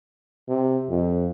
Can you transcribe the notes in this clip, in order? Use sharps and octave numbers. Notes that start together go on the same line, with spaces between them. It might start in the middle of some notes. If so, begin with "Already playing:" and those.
C3
F2